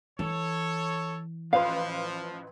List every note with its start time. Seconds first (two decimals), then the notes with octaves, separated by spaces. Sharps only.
0.19 E3 A4 C#5
1.53 A1 F3 B4 F5 C6